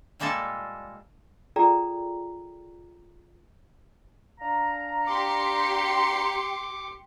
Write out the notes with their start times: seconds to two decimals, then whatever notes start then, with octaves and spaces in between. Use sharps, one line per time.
0.20 A#2 G3 G#3 A#3 A4 A5
1.56 F4 G#4 A4 D5 G5 A#5
4.40 D4 F5 A#5
5.07 G4 C6 D6 C#7